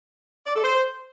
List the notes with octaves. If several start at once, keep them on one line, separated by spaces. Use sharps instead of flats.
D5
A4
C5